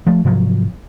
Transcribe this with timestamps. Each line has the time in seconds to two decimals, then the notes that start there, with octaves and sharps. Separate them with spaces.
0.07 F3 A3
0.25 G#2 C3 F3 F#3